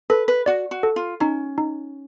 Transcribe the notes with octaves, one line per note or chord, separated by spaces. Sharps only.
A4 B4
B4
F#4 D5
F#4
A4
F4
C#4 D#4
D#4